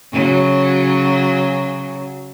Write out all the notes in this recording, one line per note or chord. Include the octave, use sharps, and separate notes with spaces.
C#3 F#3